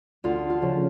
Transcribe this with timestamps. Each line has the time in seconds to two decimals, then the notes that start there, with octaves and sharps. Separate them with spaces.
0.24 D2 F4
0.50 F4
0.62 C#3 F3